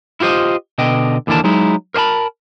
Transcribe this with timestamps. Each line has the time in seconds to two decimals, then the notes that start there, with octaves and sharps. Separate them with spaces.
0.20 E4 F4 G4 C5 D#5
0.78 B2 D3 D#5 G5
1.27 D#2 D3 E3 A#3 D5 A5
1.44 F#3 G#3 D#4 E4
1.94 A#4 C5 D5 A5 B5